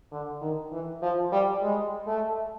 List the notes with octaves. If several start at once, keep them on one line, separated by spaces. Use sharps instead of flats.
D3
D#3
E3
F3
G3
G#3
A3